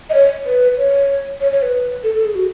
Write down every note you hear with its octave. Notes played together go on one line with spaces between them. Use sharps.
D#5
C#5
B4
C#5
C#5
C#5
B4
A4
A4
G#4
F#4